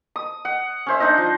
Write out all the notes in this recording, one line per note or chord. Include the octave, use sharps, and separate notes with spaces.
D#6
F#5
C#4 C5 E5
D4 D#4 C5 D#5
F3 A5